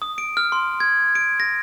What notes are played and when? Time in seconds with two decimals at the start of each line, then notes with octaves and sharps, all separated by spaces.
0.02 D#6
0.18 D7
0.37 F6
0.52 C6
0.80 G#6
1.15 D7
1.40 A#6